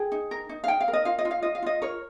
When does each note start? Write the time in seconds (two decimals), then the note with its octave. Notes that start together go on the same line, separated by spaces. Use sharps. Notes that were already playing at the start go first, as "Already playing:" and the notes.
Already playing: G#4 G5
0.12 D#4
0.31 A#4
0.49 D#4
0.64 F5
0.68 D#4 G5
0.81 F5
0.88 A#4
0.93 D#5
1.05 F4 F5
1.19 D#5
1.25 F4
1.31 F5
1.43 F4 D#5
1.55 F5
1.63 F4 D#5
1.82 A#4 C#5